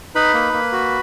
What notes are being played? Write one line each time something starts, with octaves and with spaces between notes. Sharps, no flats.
D#4 B4 B5
A#3
A#3
F#4